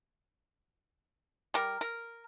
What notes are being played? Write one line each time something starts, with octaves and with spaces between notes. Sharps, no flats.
G3 A#4
A#4